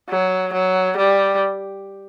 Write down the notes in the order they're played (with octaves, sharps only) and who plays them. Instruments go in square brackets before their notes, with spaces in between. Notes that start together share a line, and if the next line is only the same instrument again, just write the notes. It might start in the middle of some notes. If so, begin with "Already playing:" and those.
[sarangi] F#3
F#3
G3